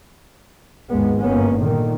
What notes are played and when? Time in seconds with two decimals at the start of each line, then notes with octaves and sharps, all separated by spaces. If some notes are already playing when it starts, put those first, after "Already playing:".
0.90 G#1 D#2 G#3 B3
1.21 G1 A#3 B3 C#4
1.61 A#2 D3 D#3